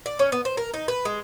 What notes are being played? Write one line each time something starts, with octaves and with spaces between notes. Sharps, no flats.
D5
C#4
B3
C5
A#4
D#4
B4
G#3